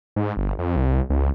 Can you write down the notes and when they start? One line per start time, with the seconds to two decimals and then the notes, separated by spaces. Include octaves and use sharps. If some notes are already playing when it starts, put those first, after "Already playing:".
0.16 G#2
0.37 G1
0.59 F2
0.76 C2
1.10 C#2